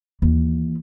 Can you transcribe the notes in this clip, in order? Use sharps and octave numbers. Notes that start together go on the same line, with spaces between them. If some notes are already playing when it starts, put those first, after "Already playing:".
D#2 E3